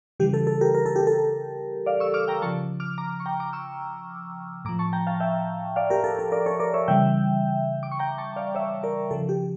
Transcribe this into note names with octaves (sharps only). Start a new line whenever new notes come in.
C#3 E3 G3 G4
A4
A4
G4 A#4
A#4
A4
G4
A4
D5 F5
C#6 E6
D6 F6
G5 A#5
C#3 F3 A5 C#6
D6 F6
A#5 D6
C#6
G5 A#5
A#5 D6
C#6 E6
A2 F3 A#5 D6
A5 C#6
G5 A#5
F5 A5
E5 G5
D5 F5
G4 A#4
A4
A4
A#4 D5
A4 C#5
A#4 D5
C#5 E5
C#3 E3 G3 E5 G5
D6
C#6
G5 A#5
A5 C#6
D5 F5
C#5 E5
A#4 D5
C#3 F3 A4
G4